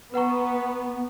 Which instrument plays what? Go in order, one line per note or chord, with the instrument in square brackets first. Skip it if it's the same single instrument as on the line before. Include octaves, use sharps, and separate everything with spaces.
[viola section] B3 [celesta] B4 F#5 A#5 C#6